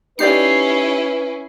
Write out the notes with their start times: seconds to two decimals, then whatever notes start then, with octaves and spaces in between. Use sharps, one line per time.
0.19 C#4 D#4 E4 G4 B4 D5 C7